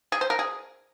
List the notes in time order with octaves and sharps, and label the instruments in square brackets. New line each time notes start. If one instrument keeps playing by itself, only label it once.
[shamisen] G#4
C5
A#4
G#4